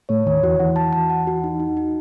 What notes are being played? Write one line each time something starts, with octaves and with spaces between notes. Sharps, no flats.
A2 A3 C#5
D#2 D#3 C#5
E2 E3 F#4
E2 E3 F#5
A5
A5
F#5
F#4
D#4
D#4
D#4